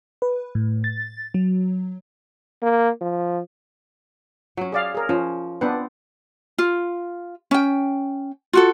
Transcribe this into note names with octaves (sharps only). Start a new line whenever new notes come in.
B4
A2
A6
F#3
A#3
F3
F#3 C#4
G#4 D5 F5
G#4 A#4
F3 C#4
B3 C4 D4 B4 F#5
F4
C#4 G5
F4 F#4 A4